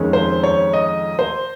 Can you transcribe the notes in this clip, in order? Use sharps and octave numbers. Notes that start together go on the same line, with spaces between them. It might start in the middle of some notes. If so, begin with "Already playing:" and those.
Already playing: F2 D#3 G#3 C#4
C5
C#5
D#5
C5